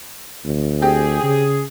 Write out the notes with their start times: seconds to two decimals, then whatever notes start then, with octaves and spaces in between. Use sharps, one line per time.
0.45 D2
0.82 C4 G4 G#4
1.23 C#3